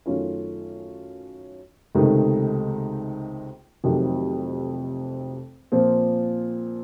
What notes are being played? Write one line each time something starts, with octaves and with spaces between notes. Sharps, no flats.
F#2 D#3 A3 C#4 F4
C#2 C3 D#3 A3 D#4
F1 F2 C3 D#3 F#3
A#2 F3 C4